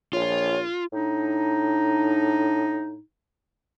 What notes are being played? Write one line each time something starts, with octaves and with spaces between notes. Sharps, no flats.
A#1 F4 C#5
A2 D4 D#4